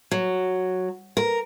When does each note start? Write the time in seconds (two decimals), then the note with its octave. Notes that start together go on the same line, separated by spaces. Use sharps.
0.11 F#3
1.17 A#4